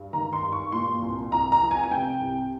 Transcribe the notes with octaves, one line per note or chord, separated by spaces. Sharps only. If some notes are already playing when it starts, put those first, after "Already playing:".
Already playing: G2
D#3 A#5
C6
G2
C#6
A#2 C6
C2
C2 A#5
A#5
F3
G#5
G#5
C3 G5
C2